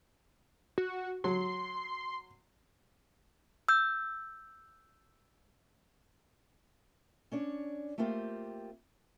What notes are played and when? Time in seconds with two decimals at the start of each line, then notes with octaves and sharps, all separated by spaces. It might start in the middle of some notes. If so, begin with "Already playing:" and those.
0.78 F#4
1.24 F#3 C6
3.69 E6 G6
7.32 C#4 D4 C#5
7.98 A3 A#3 C4 F4 G4